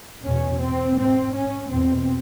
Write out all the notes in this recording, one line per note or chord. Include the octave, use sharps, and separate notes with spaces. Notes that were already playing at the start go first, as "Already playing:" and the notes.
E2 B2 C#4
C4
G#2 C4
C#4
E2 B2 C4